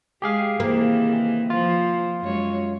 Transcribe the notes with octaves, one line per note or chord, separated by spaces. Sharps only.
G#3 G4 G#4 F5
C3 D#3 E3 A#3
F3 F4
F#2 G#3 C#5